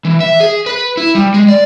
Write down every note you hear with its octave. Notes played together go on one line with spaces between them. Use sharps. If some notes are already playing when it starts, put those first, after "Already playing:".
E3
E5
G#4
B4
E4
G3
G#3
D5